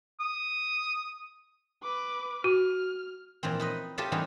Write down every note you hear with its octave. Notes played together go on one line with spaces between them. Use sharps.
D#6
B4 D6
F#4 F6
A#2 E3 F3 C4
D#4 B4 D#5
F4 G4 A4 C5 D#5 E5
E3 G3 B3 C#4 D#4 F4